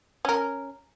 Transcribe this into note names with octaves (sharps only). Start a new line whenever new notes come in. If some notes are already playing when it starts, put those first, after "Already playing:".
C#4 A#4